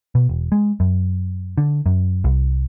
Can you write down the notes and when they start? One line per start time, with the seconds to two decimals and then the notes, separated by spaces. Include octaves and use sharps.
0.15 B2
0.29 E1
0.52 G#3
0.80 F#2
1.58 D3
1.86 F#2
2.24 C2